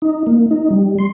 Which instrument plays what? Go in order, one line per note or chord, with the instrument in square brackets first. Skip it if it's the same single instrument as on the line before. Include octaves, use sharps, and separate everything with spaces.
[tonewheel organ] D#4
A#3
D#4
G3
C6